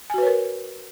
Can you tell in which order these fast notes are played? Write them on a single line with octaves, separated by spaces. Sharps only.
G#5 F#4 B4 C#5 A#4